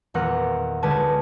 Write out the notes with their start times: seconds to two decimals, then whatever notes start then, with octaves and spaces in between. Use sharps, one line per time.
0.14 D#1 E2 A#4 F#5
0.82 C#2 D3 B4 G#5 A5